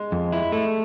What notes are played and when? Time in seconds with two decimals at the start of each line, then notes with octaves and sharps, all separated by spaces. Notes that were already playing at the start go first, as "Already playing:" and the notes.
Already playing: G#3
0.12 F2
0.32 E4
0.52 A3